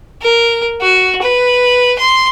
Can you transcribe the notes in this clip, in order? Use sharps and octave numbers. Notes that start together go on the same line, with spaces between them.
A#4
F#4
B4
C6